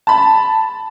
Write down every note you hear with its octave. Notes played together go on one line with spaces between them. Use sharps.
A5 B5